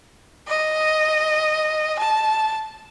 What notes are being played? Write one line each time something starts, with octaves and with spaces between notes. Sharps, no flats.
D#5
A5